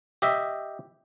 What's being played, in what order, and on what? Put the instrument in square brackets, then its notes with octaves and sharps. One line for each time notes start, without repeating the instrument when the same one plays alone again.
[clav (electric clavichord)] G4 D#5 E5